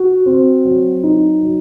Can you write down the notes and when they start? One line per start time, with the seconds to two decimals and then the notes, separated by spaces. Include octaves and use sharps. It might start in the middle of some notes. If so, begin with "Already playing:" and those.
Already playing: F#4
0.26 C4
0.65 F#3
1.03 D#4
1.42 F#3